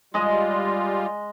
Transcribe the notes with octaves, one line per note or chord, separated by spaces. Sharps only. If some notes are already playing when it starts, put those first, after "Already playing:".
G3 G#3 F4 D#5